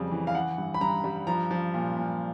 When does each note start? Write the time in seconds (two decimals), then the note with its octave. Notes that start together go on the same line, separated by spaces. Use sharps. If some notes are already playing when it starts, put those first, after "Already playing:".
Already playing: F2 C#3 G3
0.11 E3
0.27 F5
0.35 E3 F#5
0.58 G2
0.74 B5
0.81 G2 A#5
1.04 G3
1.27 F3 A#5
1.51 F3
1.74 A#2
1.97 A#2